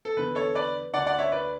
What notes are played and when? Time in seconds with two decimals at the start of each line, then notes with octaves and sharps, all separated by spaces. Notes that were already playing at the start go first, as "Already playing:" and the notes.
0.05 A4
0.16 E2 D3 B4
0.35 A4 C#5
0.55 B4 D5
0.93 D3 D5 F#5
0.98 D2
1.06 D5 F#5
1.18 C#5 E5
1.32 B4 D5